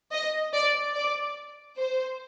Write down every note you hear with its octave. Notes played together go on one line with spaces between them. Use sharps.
D#5
D5
D5
C5